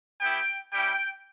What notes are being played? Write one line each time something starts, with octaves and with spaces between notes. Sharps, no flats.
B3 E4 G4 G5
G3 C#4 E4 G5